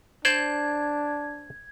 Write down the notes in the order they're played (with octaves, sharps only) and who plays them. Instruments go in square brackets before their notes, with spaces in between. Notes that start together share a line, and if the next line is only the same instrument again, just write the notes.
[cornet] D4 [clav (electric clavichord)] C5 D5 [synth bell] G#6